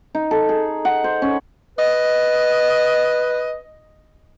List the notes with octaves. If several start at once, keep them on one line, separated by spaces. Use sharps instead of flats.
D#4
A4
G#4
F#5
C5
C#4
B4 D#5